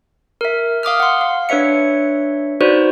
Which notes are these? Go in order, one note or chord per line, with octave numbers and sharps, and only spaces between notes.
A#4 E5
F5 D6 D#6 F6
F#5 C6
F5
D4 B4 C#5 E5 C#7
D#4 F#4 B4 C5 D5